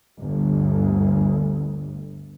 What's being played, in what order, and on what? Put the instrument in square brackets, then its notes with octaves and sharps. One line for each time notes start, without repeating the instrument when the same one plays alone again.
[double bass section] G1 D2